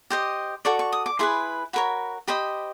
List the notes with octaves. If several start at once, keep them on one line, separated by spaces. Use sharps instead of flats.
G4 C5 D#5
F#4 A4 D5 C#6
C#6
D#6
D6
E4 G#4 B4 C6
F#4 A#4 C#5 B5
G4 C5 D#5 B5